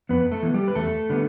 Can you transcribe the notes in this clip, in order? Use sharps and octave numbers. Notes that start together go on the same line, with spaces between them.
F2 B3 B4
A3 A4
E3 B3
G3 G4
B4
E2 A3 A4
D3 G3 B3